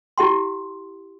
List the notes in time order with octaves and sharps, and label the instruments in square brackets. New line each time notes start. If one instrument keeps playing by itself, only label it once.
[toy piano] E4 G4 F#5 C6